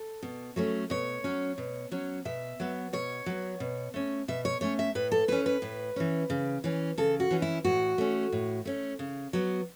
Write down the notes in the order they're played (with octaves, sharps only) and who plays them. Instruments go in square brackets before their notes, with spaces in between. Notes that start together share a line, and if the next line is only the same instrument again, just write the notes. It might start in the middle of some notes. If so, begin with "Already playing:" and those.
Already playing: [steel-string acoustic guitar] A4
B2
F#3 A3 C#4
B2 C#5
F#3 C#4
B2
F#3 C#4
B2 E5
F#3 B3
B2 C#5
F#3 B3
B2
A3 C#4
B2 E5
C#5
A3 C#4 C#5
E5
A2 B4
A4
E3 C#4 B4
B4
A2
E3 C#4
C#3
E3 C#4
C#3 A4
F#4
E3 C#4
E4
A2 F#4
A3 C#4
A2
A3 C#4
C#3
F#3 B3